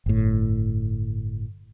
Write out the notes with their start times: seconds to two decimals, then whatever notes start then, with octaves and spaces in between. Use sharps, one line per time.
0.06 G1 A2